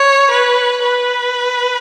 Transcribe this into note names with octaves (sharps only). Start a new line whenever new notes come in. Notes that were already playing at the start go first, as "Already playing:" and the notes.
Already playing: C#5
B4
B4